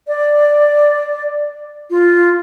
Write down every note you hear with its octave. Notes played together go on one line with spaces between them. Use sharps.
D5
F4